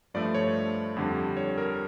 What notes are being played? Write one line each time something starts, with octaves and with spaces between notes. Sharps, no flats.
G2 F3 A3 D5
C#5
F2 D3 G3
C#5
A#4